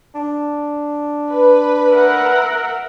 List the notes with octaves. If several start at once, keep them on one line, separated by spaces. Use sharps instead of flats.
D4
B4
A#4 E5 F#5